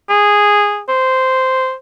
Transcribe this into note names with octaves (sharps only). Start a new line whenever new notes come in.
G#4
C5